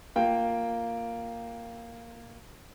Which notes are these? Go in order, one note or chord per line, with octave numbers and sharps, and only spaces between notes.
A#3 F4 G5